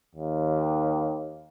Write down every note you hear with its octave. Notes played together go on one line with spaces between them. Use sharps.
D#2